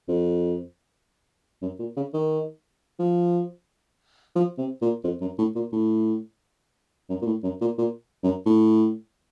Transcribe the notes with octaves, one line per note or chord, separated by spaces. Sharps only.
F2
F#2
A#2
C#3
D#3
F3
F3
C3
A#2
F2
F#2
A2
A#2
A2
F#2
A#2
A2
F#2
A#2
A#2
F#2
A2